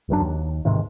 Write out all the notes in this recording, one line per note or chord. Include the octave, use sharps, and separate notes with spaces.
G1 F#2 F#3 D4
D#2
A1 G#2 C3 D#3